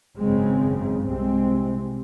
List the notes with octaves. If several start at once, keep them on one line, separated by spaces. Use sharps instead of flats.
G#1 F#2 C#3 G#3 C4
C2 C3 G#3 C4